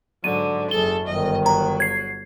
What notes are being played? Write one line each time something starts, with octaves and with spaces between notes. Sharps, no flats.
G#2 D3 F#3 D#7
F#1 F#2 G#4 A4 G7
G1 D#3 D#5
F#3 A#5
G#6 C7